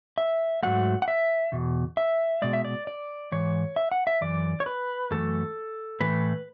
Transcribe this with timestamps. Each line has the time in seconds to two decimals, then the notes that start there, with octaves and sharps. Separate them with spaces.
0.18 E5
0.63 G#2 F#3 A3 F#5
1.02 F#5
1.08 E5
1.52 E2 B2
1.97 E5
2.42 B2 G#3 D5
2.53 E5
2.65 D5
2.87 D5
3.32 G#2 E3 C#5
3.76 E5
3.91 F#5
4.07 E5
4.21 F#2 E3 D5
4.60 C#5
4.66 B4
5.11 F#2 E3 A3 A4
6.00 A2 E3 A3 B4